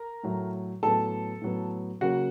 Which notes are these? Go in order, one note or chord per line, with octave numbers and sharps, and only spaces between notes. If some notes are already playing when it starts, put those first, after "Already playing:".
Already playing: A#4 A#5
A2 F#3 A3
A2 F#3 B3 A4 A5
A2 F#3 B3
C#3 F#3 A#3 C#4 F#4 F#5